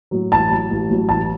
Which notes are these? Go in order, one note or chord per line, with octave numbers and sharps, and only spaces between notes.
A2 F#3
A1 A5
A2 F#3
A1
A2 F#3
A1 A5